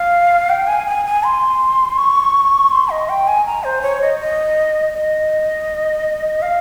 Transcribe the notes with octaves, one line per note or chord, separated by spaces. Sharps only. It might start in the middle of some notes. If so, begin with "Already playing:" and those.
Already playing: F5
G5
G#5
G#5
G#5
C6
C#6
C6
D#5
G5
G#5
A#5
C5
C#5
D#5
D#5
D#5
F5